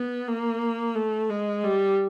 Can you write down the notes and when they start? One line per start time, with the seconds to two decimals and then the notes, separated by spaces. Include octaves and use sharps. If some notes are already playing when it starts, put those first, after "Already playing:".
Already playing: B3
0.27 A#3
0.96 A3
1.30 G#3
1.64 G3